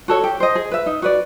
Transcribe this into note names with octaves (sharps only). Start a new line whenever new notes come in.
F#4 A4 C#5
G4
C5 D#5
G#4
B4 E5
D#4
F#4 B4 D5